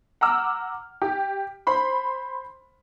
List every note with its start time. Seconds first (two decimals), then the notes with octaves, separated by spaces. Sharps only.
0.21 F#5 A#5 D6 E6 F6
1.02 G4
1.67 C5 B5 C6